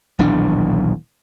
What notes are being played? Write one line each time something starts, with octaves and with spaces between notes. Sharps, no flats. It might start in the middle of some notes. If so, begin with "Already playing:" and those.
D#1 B1 E3 D4